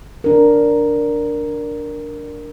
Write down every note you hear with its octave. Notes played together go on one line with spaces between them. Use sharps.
D4 A#4